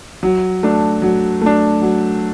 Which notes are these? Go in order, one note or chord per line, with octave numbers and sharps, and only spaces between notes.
F#3
A3 D4
F#3
A3 D4
F#3